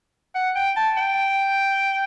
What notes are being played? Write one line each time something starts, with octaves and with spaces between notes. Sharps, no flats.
F#5
G5
A5
G5